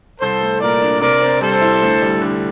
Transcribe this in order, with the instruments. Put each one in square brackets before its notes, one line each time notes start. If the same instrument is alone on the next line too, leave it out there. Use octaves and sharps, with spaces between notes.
[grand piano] C2 [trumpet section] A4 C5
[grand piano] A3
[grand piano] A#2 [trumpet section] A#4 D5
[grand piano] D4
[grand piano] C3 [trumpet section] A#4 D5
[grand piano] C4
[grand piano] G3 [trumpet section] A4 C5
[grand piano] E4
D2
G3
D3